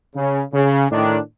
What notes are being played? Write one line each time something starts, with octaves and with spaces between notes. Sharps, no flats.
C#3
C#3
A2 D#3 D4